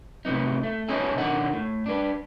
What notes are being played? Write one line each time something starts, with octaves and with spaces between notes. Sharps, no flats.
A2 C3 B3 D#4
A3
B3 C#4 D#4 G#4 A4
B2 D3 D#3 D#4 F#5
A2
D4 B4